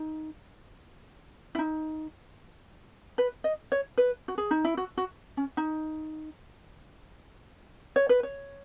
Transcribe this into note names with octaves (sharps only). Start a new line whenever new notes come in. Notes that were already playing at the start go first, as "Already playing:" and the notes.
Already playing: D#4
E4
D#4
B4
D#5
C#5
B4
F#4
G#4
D#4
E4
F#4
F#4
C#4
D#4
C#5
B4
C#5